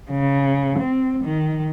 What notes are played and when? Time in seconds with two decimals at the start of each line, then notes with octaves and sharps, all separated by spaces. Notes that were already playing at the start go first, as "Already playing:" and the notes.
0.10 C#3
0.78 C4
1.23 D#3